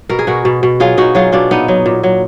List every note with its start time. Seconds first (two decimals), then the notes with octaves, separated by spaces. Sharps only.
0.09 B2 A#4
0.19 G#4
0.27 B2 F#4 A#4
0.45 B2
0.63 B2
0.80 F#3 F4 G#4
0.97 B2 D#4 F#4
1.15 F#3 F4 G#4
1.32 B2 D4 F4
1.51 A#2 B3 D#4
1.68 F#3
1.86 A#2
2.03 F#3